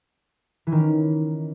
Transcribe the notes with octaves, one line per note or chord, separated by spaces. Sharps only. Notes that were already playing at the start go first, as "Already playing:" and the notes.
E3
D#3
C#4